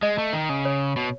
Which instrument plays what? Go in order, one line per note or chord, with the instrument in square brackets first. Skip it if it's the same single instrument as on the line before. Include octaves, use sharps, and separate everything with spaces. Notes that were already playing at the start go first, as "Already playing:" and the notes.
[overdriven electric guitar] G#3 [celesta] D#5
[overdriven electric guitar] A3
D#3
C#3
[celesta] C#5
[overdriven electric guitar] B2